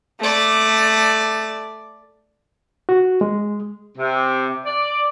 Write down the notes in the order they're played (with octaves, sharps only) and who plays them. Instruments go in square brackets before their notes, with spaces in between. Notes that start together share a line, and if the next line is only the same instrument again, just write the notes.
[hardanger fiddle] A3 D5
[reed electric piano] F#4
G#3
[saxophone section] C3
D5